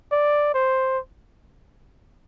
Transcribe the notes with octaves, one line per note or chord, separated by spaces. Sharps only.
D5
C5